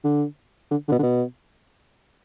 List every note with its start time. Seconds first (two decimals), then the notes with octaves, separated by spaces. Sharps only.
0.04 D3
0.71 D3
0.88 D3
0.92 B2
0.99 D3
1.03 B2